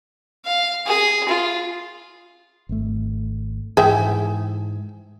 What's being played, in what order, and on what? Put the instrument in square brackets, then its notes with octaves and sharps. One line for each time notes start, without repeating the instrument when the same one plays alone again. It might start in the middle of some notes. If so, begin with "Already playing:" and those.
[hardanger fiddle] F5
G#4
F4
[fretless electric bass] G#1 A3
[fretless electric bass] G#2 E3 [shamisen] G#4 E5 G5